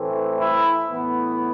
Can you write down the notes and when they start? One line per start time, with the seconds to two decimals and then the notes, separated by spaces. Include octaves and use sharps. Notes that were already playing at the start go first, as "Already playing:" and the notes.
Already playing: A2 E3 A3 C4
0.40 E4
0.91 A2 E3 B3